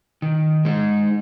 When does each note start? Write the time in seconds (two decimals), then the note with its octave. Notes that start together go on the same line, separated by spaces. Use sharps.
0.22 D#3
0.65 G#3 D#4